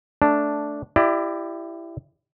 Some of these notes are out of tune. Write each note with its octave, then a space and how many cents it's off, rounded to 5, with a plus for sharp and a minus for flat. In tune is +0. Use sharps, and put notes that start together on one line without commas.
A3 +0 D4 -5
E4 +20 G4 +0 D5 +30